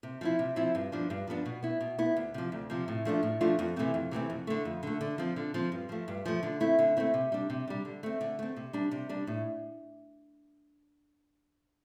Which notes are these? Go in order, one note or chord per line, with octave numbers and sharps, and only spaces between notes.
C3
F3 C4 E4
C3
F3 C4 E4
G2
F3 B3 D4
G2
F3 B3 D4
B2
B3 E4
B2
B3 E4
D2
C3 F3
D2
C3 F3
A2
F3 A3 D4 F4
A2
F3 A3 D4 F4
F2
C3 E3 A3 C4
F2
C3 E3 A3 C4
F2
D3 A3
F2
D3 A3
D3
F3 C4
D3
F3 C4
G2
F3 A3
G2
F3 A3
D3
A3 C4 E4
D3
A3 C4 E4
C3
G3 D4
C3
G3 D4
D3
A3 C4
D3
A3 C4
C3
G3 D4
C3
G3 D4
A2